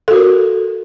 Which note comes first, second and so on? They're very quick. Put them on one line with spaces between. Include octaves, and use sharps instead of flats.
A4 F#4 A#4